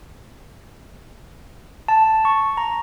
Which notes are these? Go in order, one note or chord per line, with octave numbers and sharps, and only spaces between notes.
A5
C#6
A#5